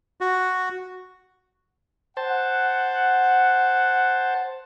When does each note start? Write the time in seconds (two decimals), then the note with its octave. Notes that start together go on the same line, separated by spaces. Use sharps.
0.21 F#4
2.17 C5 F#5 A5